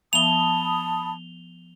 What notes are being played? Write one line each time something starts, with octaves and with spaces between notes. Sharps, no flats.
F3 B3 E5 A5 B5 D#6 F7 G7